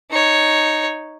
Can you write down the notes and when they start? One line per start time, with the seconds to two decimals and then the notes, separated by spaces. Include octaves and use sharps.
0.11 D#4 C#5